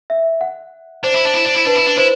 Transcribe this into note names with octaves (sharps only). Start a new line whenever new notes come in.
E5
F#5
D4 C5
E4
D4
E4
D4
E4
D4 B4
E4
D4
E4 C5